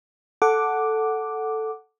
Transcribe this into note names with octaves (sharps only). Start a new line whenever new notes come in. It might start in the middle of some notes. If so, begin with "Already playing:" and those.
A4 F#5 D6